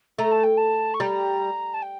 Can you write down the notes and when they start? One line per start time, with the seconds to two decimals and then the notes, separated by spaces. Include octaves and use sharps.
0.18 A3 A#5
0.31 A5
0.43 G5
0.57 A5
0.94 C#6
1.00 G3 A#5
1.74 A5
1.82 G5